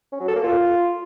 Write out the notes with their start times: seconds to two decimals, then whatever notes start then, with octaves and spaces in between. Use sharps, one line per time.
0.12 C#4
0.20 F#3
0.28 A4
0.36 A#3
0.44 F4